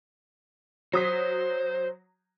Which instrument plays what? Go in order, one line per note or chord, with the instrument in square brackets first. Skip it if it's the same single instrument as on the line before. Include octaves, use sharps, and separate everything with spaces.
[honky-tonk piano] F#3 D#6 B6 [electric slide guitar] C5